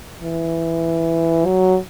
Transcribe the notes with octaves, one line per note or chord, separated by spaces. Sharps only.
E3
F#3